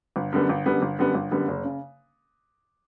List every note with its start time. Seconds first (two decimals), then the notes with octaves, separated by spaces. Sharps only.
0.16 G1
0.33 F#2 D3 G3 B3
0.49 G1
0.66 F#2 D3 G3 B3
0.82 G1
0.99 F#2 D3 G3 B3
1.15 G1
1.31 F#2 D3 G3 B3
1.48 F#1
1.64 C#3